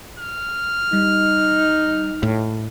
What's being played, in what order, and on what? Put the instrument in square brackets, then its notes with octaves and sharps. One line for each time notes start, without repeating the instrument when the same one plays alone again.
[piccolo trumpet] F6
[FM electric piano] G3 [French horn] D#4
[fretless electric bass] A2